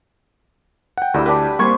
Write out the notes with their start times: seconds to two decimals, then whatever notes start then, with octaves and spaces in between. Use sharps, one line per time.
0.98 F#5 G5
1.14 D2 G3 E4 D#5 E6
1.26 D4 G4 B4
1.59 G3 A#3 C4 C6 C#6 G#6